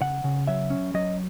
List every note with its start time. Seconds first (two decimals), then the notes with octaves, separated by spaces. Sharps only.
0.01 C#3 F#5
0.24 C#3
0.47 F#3 E5
0.70 C#4
0.94 F#3 D#5